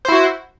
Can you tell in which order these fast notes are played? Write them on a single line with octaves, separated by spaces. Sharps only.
C5 E4 F#4